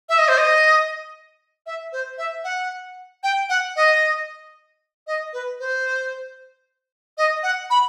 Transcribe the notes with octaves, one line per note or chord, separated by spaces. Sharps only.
E5
D#5
C5
D#5
E5
C5
E5
F#5
G5
F#5
D#5
D#5
B4
C5
D#5
F#5
B5